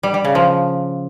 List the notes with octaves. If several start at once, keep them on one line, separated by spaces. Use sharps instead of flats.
G3
G3
C#3
F3